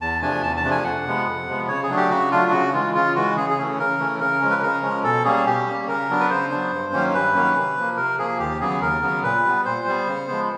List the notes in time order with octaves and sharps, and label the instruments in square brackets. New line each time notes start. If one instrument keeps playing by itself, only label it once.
[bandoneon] E2 A5
C3 F3 A3 D4 G#5
E2 A5
A5
C3 F3 A3 D4
G#5
F2 F#5
C3 F3 G#3 B3
F2
C3 F3 G#3 B3
C#3 C#5
G#4
F#3 A3 D4
G4
C#3 F#4
F#3 A3 D4 F4
C#3 F#4
E3 G#3 F4
C#3 F4
E3 G#3 F#4
C#3 G#4
G#4
E3 A3 C#4
C#3 A#4
E3 A3 C#4
C#3 A#4
F3 G#3 C#4
B4
C#3 A#4
F3 G#3 C#4
B2 A4
G3 A#3 C#4 G#4
B2 G4
G3 A#3 C#4
C#3 A#4
F#3 B3 D4
B4
C#3 C5
F#3 B3 D4
G2
D#3 F#3 A#3 C#4
G2 B4
D#3 F#3 A#3 C#4
C3
F3 A#3
C3 A#4
F3 A#3 G#4
D#2 G4
C#3 F#3 B3 G#4
D#2 A#4
C#3 F#3 B3
A#2 B4
G3 B3
A#2 C5
G3 B3
C#3
F3 G#3 B3